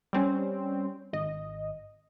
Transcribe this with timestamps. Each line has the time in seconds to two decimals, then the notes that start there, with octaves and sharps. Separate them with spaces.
0.13 G3 C4 C#4
1.13 G#1 D#5